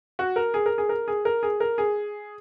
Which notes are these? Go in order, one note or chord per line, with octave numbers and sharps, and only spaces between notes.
F#4
A#4
G#4
A#4
G#4
A#4
G#4
A#4
G#4
A#4
G#4